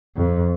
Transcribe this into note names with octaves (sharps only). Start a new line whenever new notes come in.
F2